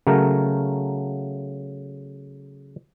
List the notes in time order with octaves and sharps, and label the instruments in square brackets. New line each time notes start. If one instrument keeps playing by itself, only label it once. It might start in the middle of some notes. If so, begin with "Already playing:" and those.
[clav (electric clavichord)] C#3 F#3 A3 A#4